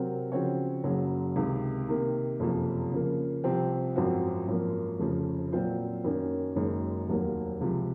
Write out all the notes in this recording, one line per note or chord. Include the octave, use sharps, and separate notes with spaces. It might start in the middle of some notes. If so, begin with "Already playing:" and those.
Already playing: C3 F#3 C4 F#4 A#4
C#3 F3 C4 F#4 C#5
F#1 F#2 C#3 F#3
C#2 C3 D#3
C3 D#3 A#3
F#1 F2 C3 F3
C#3 F3 A#3
C2 C3 F3 C4
G#1 F#2 F3 C4 F#4
G#1 F#2 F3 A#3
F1 F2 C#3 F3
A#2 F#3 C4 F4 C5
F#2 D#3 A#3 C#4
F#1 F#2 D#3 G#3
F1 D#2 D#3 F#3 A#3
C#2 C3 F3